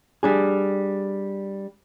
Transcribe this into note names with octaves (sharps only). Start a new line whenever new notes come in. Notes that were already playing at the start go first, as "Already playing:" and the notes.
G3 D4 G#4